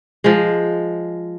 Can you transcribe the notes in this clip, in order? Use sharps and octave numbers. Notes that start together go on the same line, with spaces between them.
F3 G#3